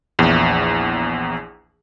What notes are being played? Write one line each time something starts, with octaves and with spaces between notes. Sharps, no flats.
A#1 E2